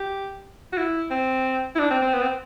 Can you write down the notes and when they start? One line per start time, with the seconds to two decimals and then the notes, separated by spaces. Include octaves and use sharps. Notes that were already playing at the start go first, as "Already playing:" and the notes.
Already playing: G4
0.73 F#4
0.77 E4
1.10 C4
1.75 E4
1.79 D4
1.90 C4
2.02 C4
2.13 B3
2.21 C4